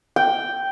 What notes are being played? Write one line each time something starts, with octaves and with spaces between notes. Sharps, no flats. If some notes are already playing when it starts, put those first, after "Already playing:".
G5